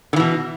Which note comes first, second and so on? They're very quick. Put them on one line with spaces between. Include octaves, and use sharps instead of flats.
D3 E3 B2